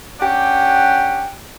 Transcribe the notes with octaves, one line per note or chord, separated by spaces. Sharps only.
C#4 D4 G4 F#5